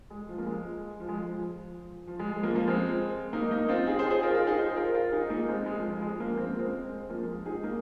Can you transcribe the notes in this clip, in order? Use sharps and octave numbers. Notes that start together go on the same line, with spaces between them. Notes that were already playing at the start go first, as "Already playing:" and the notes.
G#3
F3
A#3
G#3
F3
G#3
F3
F3
G#3
G#3
F3 A#3
F3 A#3
G#3 C4
A#3 D#4
A#3 D#4
C4 F4
D#4 G#4
G#4 C5
G#4 C5
F4 A#4
F4 A#4
D#4 G#4
G#4 C5
F4 A#4
F4 A#4
D#4 G#4
A#3 D#4
G#3 C4
G#3
F3
G#3
G#3
F3 A#3
C4
A#3
G#3 C4
F3 A#3
G#3
D#4 G#4
A#3 D#4